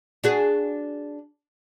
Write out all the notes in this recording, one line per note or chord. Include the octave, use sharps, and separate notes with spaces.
D4 F#4 G#4